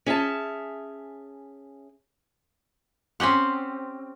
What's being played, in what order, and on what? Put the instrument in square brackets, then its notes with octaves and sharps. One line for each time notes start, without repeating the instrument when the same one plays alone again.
[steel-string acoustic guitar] C#4 G#4 E5 A5
[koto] C4 C#4 G4 F#5